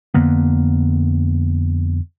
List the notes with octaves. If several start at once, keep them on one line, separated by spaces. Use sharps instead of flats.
F2 D3 A#3 B3